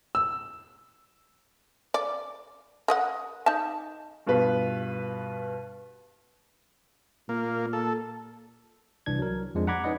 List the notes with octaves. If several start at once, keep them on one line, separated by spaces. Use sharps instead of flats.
E6
D5
A#4 D#5 F#5
D#4 A5
G2 B2 F4 B4
A#2 A#3
A4
C2 E3 D4 G#6
F#3 A#4
F2 F3 G#3 D4
F#5 A#5 B5 D6 G#6
C#4 D#4 B4 D5 D#5 F#5